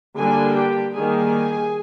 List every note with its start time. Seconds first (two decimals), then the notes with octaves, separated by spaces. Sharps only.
0.17 D3 G3 A#3 D4 G#4 G#5
0.56 G4 G5
0.95 D#3 G3 A#3 G#4 G#5